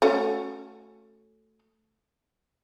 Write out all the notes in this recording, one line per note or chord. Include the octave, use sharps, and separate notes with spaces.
A3 C#4 F#4